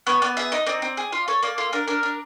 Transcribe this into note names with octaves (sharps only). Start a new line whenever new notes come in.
B3 C#5
B3 D5
G#4 E5
D#4 D#5
C4 D5
C4
G#4
F4
A4 C#5
A#3 D5
F4 A4
D4 A#4
D4 A#4
D4